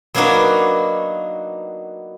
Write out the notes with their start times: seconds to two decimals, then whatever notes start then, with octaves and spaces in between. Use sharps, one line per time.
0.14 F#3 A#3 B3 D4 D#4 F#4